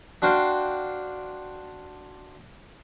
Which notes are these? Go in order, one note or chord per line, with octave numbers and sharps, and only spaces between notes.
D4 F#4 C5 F5 G5